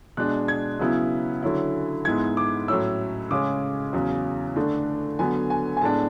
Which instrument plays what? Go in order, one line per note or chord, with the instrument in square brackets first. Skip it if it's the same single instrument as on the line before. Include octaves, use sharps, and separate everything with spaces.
[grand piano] B2 G#3 D4 F#6
G#6
C#3 F#3 B3 E4
D3 F#3 C#4 E4
G#2 G#3 B3 E4 G#6
D6
A2 F#3 A3 C#4 E4 E6
C#3 G#3 C#4 D6
E2 C#3 F#3
D3 A3 D4
D3 F#3 B3 G#5
G#5
G#5
A2 G#3 B3 D4 A5